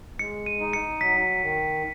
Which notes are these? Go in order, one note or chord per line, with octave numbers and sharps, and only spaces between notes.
G#3 C#7
D#7
D#4
C#7
F#3 B6
D#3